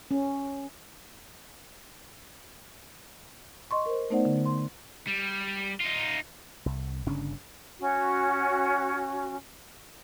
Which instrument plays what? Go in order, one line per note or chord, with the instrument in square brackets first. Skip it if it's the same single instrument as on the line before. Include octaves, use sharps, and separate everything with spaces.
[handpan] C#4
[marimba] D#5 C6 C#6
A#4 C5
A3 B3 D#4 C5 D5 F#5
D3
C6
[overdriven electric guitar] G3
D#4 F4
[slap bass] C2
G1 C#3 C#4 D4
[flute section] C#4 F#4